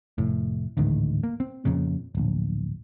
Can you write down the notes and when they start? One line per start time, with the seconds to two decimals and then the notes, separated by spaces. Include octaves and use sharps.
0.18 F1 A2
0.77 A1 D2 G#2 D#3
1.23 A#3
1.40 C4
1.65 F2 A#2 C#3
2.15 D1 A#1